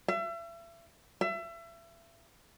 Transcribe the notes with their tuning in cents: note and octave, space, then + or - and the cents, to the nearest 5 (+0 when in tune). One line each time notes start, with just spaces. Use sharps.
E5 +35
E5 +30